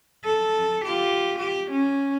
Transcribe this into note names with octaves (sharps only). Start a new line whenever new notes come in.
A4
F4 G4
G4
C#4